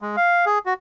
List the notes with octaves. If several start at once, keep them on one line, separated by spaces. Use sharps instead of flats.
G#3
F5
G#4
F#4